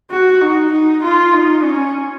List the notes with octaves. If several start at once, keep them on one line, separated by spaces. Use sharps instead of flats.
F#4
D#4
D#4
F4
D#4
C#4